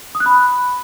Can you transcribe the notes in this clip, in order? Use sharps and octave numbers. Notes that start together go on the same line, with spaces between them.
D#6
F#6
B5